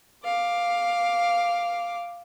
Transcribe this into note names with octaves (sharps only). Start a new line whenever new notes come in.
F5 D6